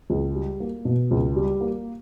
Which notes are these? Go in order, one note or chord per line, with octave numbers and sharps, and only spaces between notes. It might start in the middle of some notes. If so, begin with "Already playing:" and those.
C#2
G3
A#3
B2
C#2
G3
A#3